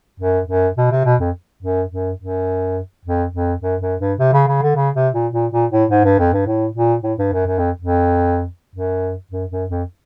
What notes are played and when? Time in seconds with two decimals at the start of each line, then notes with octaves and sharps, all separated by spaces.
0.20 F#2
0.48 F#2
0.77 B2
0.91 C3
1.05 B2
1.20 F2
1.62 F#2
1.92 F#2
2.19 F#2
3.05 F2
3.34 F2
3.62 F#2
3.81 F#2
4.00 G2
4.19 C3
4.33 C#3
4.48 C#3
4.62 D3
4.76 C#3
4.95 C3
5.14 A#2
5.33 A#2
5.52 A#2
5.71 A2
5.90 G#2
6.04 G2
6.19 F2
6.33 G2
6.47 A2
6.75 A#2
7.03 A2
7.18 G2
7.33 F#2
7.46 F#2
7.58 F2
7.81 F2
8.75 F#2
9.31 F#2
9.51 F#2
9.69 F2